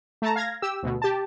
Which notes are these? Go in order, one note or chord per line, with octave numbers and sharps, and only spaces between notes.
A3 A5 A#5
F5 G#6 A#6
G4 E6
D2 B2
G4 A5